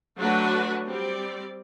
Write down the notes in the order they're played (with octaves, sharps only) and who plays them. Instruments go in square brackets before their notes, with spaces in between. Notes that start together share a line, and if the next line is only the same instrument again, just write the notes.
[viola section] F#3 A3 D4 F#4 B4
G3 C4 G4 D5